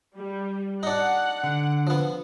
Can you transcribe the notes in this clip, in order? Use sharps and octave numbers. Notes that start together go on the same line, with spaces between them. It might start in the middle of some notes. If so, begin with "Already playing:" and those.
G3
D4 D#4 F#5
D3
F3 B3